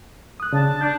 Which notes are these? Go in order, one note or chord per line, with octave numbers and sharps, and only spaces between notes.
D#6 F#6
C#3 D4 A5
D4 G6